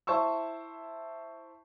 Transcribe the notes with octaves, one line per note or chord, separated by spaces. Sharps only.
E4 C5 A5 C#6 E6